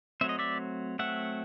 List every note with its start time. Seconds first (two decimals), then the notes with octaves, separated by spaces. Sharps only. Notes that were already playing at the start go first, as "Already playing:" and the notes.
0.21 F#3 A3 C4 E5
0.29 D#5
0.39 D5 E5
0.99 F#3 A3 C4 E5 F#5